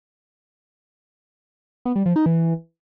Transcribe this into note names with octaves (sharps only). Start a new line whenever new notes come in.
B3
G3
F3
D#4
E3